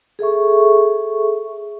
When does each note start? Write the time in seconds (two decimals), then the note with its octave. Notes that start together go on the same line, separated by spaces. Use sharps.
0.19 G#4 A4 E5 C#6